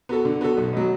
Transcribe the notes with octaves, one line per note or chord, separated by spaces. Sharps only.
B3 F#4 A4
D3
B3 F#4 A4
B1
B2 F#3